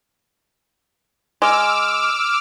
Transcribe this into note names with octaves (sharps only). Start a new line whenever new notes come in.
G#3 D6 E6 F6